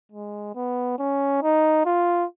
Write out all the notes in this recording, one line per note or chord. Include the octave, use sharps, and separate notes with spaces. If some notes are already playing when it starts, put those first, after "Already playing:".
G#3
B3
C#4
D#4
F4